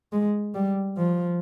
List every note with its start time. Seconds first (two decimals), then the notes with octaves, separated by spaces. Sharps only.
0.12 G#3
0.55 G3
0.97 F3